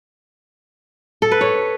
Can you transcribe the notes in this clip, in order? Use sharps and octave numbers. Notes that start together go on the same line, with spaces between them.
A4
B4
C#5